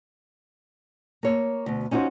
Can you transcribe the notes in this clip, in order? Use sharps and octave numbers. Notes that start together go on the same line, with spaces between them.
A#3 C#5
D2 B2
C#4 D#4 F4 F#4 C5